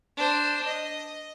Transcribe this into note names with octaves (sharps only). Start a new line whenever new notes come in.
D4 C5
D#5